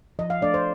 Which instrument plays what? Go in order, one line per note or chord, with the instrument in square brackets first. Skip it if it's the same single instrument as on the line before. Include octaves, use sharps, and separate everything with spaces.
[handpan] F3 D#5
F5
A3 D4 D5
C5